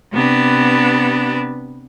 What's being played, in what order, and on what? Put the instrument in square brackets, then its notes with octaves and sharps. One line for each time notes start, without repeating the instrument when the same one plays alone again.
[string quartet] C3 B3 D4 B4